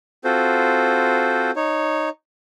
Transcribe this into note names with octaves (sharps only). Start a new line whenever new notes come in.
C4 F4 F#4 A4 C5
D#4 C#5